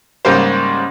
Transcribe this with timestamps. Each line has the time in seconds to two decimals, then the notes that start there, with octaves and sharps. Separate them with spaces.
0.25 G#2 C#3 G3 A#3 G4 C5